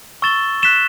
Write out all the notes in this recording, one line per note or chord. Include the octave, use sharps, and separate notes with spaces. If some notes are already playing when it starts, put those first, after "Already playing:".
C#6 E6 A6 E7 G7
F#6 B6 E7 G7